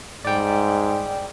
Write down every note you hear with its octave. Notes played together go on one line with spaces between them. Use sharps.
G#2 D5 G5